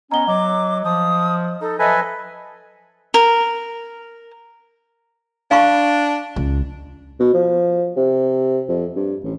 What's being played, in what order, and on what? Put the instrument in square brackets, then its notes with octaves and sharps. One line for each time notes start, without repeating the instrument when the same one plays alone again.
[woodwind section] B3 C#4 [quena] D#5 [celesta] A#5 G7
[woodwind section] F#3 [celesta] D#5 [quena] D6
[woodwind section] F3 [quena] D#6
[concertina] D#4 [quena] A4
[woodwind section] F3 F#3 D#5 [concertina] A4 B4 G#5 [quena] E5
[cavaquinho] A#4
[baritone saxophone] D4 [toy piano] F5 B5 C#6
[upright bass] C#2
[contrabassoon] B2
F3
C3
F2
G2
A1